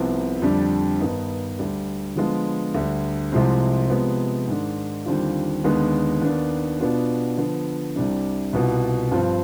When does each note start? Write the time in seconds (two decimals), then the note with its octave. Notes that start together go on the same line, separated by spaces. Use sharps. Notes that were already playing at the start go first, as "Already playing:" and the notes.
Already playing: C2 C3 F3 B3
0.42 F2 D3 G3 D4
1.00 G2 D#3 B3 D#4
1.59 D2 D3 G3
2.16 D3 F3 G#3 B3 F4
2.75 D2 D3 G3
3.32 C2 C3 F3 G#3 C4
3.90 C3 F3 G#3 B3
4.48 G#2 D#3 G#3 D4
5.06 D#2 D3 G3 C4 F4
5.64 D#2 D3 G#3 B3
6.22 D#2 D#3 B3 D4
6.80 B2 B3 D4 F4
7.38 D3 F3 B3
7.96 C2 C3 G3 D4
8.53 C2 B2 B3 F4
9.12 G2 F3 C4 F4